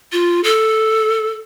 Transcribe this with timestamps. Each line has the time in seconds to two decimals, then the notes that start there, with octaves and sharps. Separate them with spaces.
0.12 F4
0.44 A4